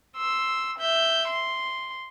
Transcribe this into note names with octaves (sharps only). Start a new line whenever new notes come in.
C6 E6
E5 G6
C6